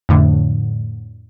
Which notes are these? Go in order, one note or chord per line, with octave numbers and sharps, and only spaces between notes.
F2 A2 D3